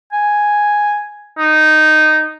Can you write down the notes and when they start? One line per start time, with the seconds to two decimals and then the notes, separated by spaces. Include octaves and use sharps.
0.12 G#5
1.39 D#4